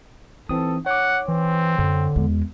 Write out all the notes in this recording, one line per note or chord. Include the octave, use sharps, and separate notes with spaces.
E3 C4 D#4 A4 D#6
C#5 F#5 D6
E3 C4
F#2 D3
E2 G#3